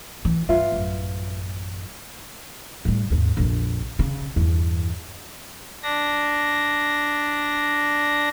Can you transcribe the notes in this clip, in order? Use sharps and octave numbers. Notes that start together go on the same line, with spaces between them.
E3
G2 F4 B4 E5
A1 F#2
A2 G3
G#1 D#2
A#1 F2
C#3
E2 G2
D4 A#6